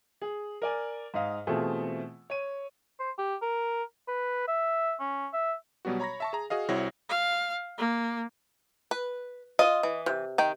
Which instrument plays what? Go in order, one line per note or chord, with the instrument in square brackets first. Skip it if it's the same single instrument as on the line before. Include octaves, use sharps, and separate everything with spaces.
[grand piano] G#4
A#4 D5 G#5
G#2 D#5 F5
B2 E3 A3 C4 F4 G#4
C#5 D#7
[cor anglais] C5
G4
A#4
B4
E5
C#4
E5
[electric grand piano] B2 F#3 G3 B3 F#4
C#5 A#5 B5 C#6 A#6
E5 A5 C#6
G#4 A#5
F#4 G#4 D#5 F5
C2 C4 E4 F#4 C#5 A#6
[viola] F5
A#3
[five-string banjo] B4
[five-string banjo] F4 [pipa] D#5
[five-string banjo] E3
[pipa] C3
[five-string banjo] D#3 G5